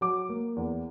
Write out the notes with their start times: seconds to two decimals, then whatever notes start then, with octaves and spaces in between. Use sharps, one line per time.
0.01 F#3 D6
0.29 A#3
0.56 E2